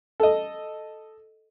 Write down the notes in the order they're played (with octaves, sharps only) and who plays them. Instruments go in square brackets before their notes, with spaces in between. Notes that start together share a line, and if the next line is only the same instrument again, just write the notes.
[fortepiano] A4 D#5